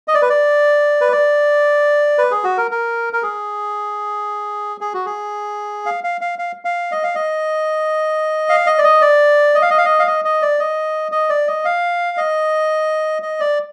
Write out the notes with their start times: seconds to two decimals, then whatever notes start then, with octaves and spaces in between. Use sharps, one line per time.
0.08 D#5
0.15 D5
0.22 B4
0.30 D5
1.01 B4
1.12 D5
2.18 B4
2.31 G#4
2.44 F#4
2.58 A#4
2.71 A#4
3.13 A#4
3.23 G#4
4.81 G#4
4.94 F#4
5.06 G#4
5.86 F5
6.04 F5
6.21 F5
6.39 F5
6.65 F5
6.92 D#5
7.03 F5
7.15 D#5
8.49 F5
8.67 D#5
8.78 D5
8.84 D#5
9.02 D5
9.55 D#5
9.62 F5
9.70 D#5
9.78 F5
9.85 D#5
9.99 F5
10.07 D#5
10.25 D#5
10.42 D5
10.60 D#5
11.12 D#5
11.30 D5
11.48 D#5
11.65 F5
12.17 D#5
13.22 D#5
13.40 D5